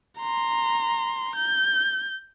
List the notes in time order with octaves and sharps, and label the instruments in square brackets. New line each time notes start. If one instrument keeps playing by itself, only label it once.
[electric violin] A#5 C6
G6